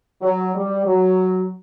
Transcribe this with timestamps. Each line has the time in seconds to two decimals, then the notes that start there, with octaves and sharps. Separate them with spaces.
0.22 F#3
0.55 G3
0.86 F#3